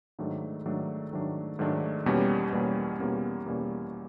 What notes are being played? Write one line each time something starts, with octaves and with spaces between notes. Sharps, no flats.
G#2 D#3 F#3 A3 D4
G#2 D#3 F#3 A3 D4
G#2 D#3 F#3 A3 D4
G#2 D#3 F#3 A3 D4
E2 B2 G3 A#3 C#4
E2 B2 G3 A#3 C#4
E2 B2 G3 A#3 C#4
E2 B2 G3 A#3 C#4